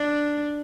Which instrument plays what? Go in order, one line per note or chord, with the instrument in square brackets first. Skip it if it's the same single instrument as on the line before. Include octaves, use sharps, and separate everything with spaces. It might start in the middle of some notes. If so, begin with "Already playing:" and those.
Already playing: [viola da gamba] D4